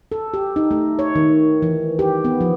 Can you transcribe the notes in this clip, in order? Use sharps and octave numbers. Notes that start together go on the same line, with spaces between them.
A4
G4
D#4
A3
C#5
D#3
E3
G4
B3
F3